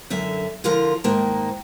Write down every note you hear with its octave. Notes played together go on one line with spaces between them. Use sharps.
F#2 D3 E5
D3 F3 F4 A#4
G#2 D#3 A#3 A5